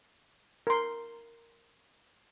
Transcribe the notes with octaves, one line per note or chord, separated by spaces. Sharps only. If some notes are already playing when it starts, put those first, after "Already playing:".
A#4 C6